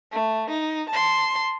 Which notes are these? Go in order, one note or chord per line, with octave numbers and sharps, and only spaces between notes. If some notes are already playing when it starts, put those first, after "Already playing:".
A3
D#4
A5 C6